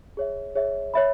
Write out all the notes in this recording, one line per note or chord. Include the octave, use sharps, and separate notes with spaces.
G#4 C#5 E5
G#4 C#5 E5
C#5 E5 B5